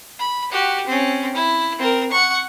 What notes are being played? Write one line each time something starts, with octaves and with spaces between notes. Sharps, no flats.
B5
F#4 G4
C4 C#4
E4
C4 A#4
F#5 C#6